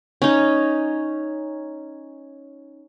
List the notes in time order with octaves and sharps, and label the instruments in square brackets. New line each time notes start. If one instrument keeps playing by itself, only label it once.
[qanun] C#4 D#4